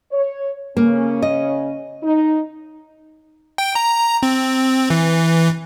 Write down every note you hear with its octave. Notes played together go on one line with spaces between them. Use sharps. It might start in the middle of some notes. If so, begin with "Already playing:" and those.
C#5
C#3 A#3 C#4
D#5
D#4
G5
A#5
C4
E3